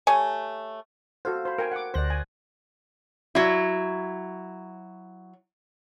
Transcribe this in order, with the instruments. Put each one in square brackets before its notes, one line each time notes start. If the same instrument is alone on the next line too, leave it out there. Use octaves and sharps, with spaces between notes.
[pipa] A3 G4 C#5 G#5
[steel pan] F#4 A4 C5 [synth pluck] F5
[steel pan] C5 B5
A#4 G5 G#5
F#5 D6
[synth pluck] D2 F#6 A#6 [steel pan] C5 D5
[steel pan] G#5
[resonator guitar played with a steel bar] F#3 E4